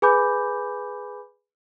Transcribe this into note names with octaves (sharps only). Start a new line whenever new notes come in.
G#4 B4 G#5 B5 D6 G6